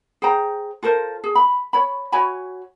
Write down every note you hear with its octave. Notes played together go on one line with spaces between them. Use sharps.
G#4 C5 G5 A#5
F4 A4 A#4 C5
G#4
B5
C#5 B5
F#4 C#5 G#5 B5